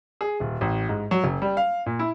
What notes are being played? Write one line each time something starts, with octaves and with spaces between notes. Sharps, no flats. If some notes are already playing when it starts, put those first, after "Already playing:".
G#4
D#1
A1
G#2
F#3
F#1
G3
F5
A#2
E4